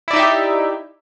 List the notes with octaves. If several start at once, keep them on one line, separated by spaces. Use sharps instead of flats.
D#4 E4 G4 D5 E5